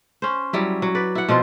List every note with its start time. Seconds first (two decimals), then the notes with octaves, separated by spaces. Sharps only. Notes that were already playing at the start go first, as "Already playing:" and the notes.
0.22 C#4 C5
0.53 F#3 G3 E4
0.82 F#3
0.95 B4 D5
1.15 E4 F#5
1.29 B2 F3 C4 F4